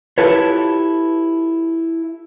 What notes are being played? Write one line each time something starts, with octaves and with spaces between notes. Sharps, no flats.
E4 F4 G4 A4 B4 C#5